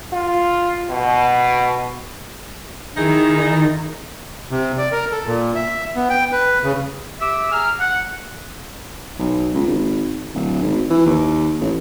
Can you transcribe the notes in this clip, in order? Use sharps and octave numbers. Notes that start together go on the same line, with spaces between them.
F4
B2
D#3 D#4 E4 G#4
C3
D5
A#4
A4
A#2
E5
B3
G5
B4
C#3
G4 E5 D6 E6
G#4 G#5 A#5 F6
F#5
B1
C#2
G#1
D1
G#1
E3
D#2
A1